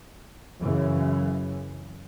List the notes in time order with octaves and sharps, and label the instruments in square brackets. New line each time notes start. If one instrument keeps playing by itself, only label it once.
[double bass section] F#2 C#3 E3